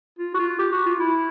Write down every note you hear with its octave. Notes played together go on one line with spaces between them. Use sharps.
F4
F#4
F4
G4
F#4
F4
E4